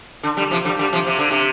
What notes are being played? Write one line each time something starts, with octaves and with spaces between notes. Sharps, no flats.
D3
D3 G3
C3 F3
D3 G3
D3 G3
C3 F3
C3
D3
C3